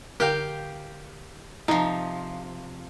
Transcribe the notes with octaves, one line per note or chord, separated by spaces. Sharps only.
D3 G4 A#4 F5 G5
C3 F3 D#4 A#5